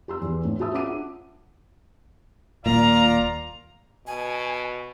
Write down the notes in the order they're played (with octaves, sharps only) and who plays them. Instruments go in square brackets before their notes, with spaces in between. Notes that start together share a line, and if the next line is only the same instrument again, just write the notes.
[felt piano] G4 C6 E6
E2
A2
F#4 G#4 E5 A5 D#6 E6
C#4 D4 F4 F#5 D6 D#7
[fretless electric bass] D#1 A#2 [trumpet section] F4 D5 F5 [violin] A#5
[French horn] B2 [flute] G#5